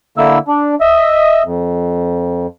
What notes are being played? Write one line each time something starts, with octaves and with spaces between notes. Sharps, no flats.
D3 A#3 E4 E6
D4
D#5 E5
F2